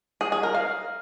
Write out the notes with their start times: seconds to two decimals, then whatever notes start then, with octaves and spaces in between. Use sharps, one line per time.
0.21 G#4
0.32 G#4
0.43 A#4
0.55 F5